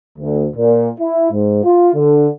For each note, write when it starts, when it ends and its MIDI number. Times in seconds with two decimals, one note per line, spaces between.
0.17 0.45 38
0.55 0.87 46
0.98 1.27 64
1.30 1.62 44
1.63 1.89 65
1.93 2.27 50